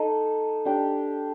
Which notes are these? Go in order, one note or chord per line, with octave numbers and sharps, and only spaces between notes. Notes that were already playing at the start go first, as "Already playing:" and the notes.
Already playing: D#4 A4 D#5
D4 G4 D5